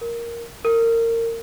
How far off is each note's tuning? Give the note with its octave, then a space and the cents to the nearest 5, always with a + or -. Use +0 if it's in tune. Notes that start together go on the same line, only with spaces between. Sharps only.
A#4 +5
A#4 -25